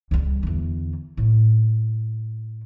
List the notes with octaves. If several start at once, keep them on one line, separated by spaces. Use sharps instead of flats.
C#2 G3
E2 D3
A2